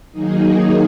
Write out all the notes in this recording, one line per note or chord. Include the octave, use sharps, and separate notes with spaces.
D#3 F#3 A#3 D#4 G#4